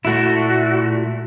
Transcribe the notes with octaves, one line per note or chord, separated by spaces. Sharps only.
A#2 A3 E4 F#4